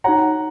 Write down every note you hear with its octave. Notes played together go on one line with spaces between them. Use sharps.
D#4 F#4 C#5 F#5 A#5